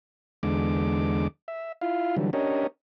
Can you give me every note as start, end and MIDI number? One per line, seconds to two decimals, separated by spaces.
0.43 1.27 40
0.43 1.27 50
0.43 1.27 56
0.43 1.27 86
1.48 1.72 76
1.81 2.16 64
1.81 2.16 65
1.81 2.16 77
2.17 2.30 50
2.17 2.30 52
2.17 2.30 54
2.17 2.30 55
2.33 2.67 61
2.33 2.67 62
2.33 2.67 67
2.33 2.67 70
2.33 2.67 73
2.33 2.67 75